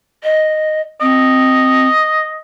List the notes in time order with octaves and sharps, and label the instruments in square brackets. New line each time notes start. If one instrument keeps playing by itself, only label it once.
[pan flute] D#5
[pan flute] C4 [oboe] D#5